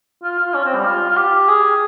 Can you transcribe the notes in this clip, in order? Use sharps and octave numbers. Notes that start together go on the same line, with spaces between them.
F4
F4
C#4
C4
G3
F4
F4
G4
G#4